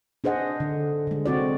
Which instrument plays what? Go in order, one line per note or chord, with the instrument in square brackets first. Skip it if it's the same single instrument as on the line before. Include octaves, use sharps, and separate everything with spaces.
[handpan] D4 G#4 C5 D#5 F#5
D3
D3 G#3
C4 F#4 D5